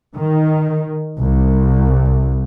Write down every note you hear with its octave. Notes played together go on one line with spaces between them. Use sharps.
D#3
C2